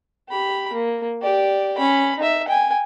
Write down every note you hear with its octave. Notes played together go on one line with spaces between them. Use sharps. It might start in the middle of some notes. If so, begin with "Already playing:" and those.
G4 B5
A#3
G4 D5
C#4 B5
D#4 E5
G5 G#5